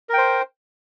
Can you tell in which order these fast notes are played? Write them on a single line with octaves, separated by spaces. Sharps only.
A#4 G5 C5